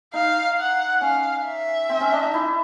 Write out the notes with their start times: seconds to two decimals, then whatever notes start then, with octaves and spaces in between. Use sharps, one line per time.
0.14 D#4 F5
0.58 F#5
1.01 C#4 F5
1.45 E5
1.89 C4
2.00 C#4
2.12 D4
2.23 D#4
2.34 E4